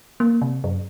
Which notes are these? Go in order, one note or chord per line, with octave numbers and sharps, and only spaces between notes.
A#3
C3
F#2